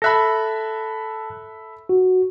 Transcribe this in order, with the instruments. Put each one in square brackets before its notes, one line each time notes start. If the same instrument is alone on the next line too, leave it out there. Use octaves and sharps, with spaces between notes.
[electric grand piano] A4 E5 B5 [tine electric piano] A5 F#6 A#6
[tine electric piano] F#4